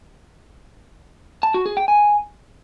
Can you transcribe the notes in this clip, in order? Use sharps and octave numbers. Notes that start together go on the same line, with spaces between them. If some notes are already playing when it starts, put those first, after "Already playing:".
A5
F#4
G#4
G5
G#5